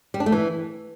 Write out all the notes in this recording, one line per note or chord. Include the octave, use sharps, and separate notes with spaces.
G3
D4
A3
E3